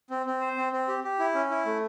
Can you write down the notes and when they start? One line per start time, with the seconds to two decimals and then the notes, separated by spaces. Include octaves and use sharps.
0.10 C4
0.26 C4
0.41 C5
0.57 C4
0.72 C4
0.88 G4
1.04 G4
1.19 E4
1.35 C#4
1.50 E4
1.66 A3